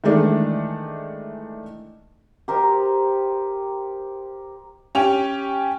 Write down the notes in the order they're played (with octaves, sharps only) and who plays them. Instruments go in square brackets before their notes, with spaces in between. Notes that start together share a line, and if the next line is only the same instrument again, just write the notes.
[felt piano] D#3 E3 G#3 A3 D4
[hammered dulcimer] G4 A#4 C5 D#5
[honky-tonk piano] C#4 G4 F7